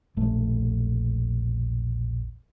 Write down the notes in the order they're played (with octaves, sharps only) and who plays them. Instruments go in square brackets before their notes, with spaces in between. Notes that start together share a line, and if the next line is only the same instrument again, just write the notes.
[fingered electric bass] E1 A#1 A3